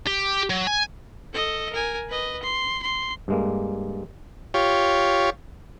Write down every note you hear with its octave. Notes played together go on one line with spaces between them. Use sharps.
G4
F#3
G#5
A4 D#5
A#4 G#5
B4 D#5
C6
C6
G2 G#3 A#3
F4 G4 C#5